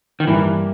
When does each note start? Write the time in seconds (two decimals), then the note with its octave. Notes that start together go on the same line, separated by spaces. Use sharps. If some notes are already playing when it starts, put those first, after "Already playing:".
0.20 D#3
0.27 G2 E3 G3 A#3 E4